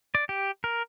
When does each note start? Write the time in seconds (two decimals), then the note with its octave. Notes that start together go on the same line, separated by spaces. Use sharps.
0.15 D5
0.29 G4
0.64 A#4